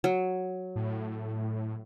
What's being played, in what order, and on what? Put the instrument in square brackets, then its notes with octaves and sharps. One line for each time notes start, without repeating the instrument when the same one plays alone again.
[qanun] F#3
[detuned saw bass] A2